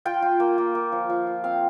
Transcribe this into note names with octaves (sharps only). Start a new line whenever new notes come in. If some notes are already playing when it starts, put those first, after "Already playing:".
F4 G5
F4
A#3
A#3
A#3
F3
F3
F4
C4 F5